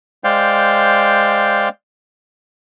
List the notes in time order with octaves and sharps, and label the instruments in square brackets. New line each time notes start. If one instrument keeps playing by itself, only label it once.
[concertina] G#3 C5 D5 F5 G5